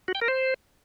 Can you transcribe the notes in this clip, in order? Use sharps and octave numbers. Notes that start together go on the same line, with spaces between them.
F#4
G5
A#4
C5